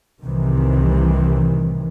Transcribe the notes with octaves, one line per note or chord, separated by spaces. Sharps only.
C2 A2 C3 D#3 E3